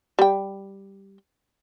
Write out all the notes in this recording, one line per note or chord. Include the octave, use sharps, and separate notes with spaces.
G3 G5